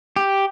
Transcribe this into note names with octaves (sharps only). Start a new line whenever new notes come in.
G4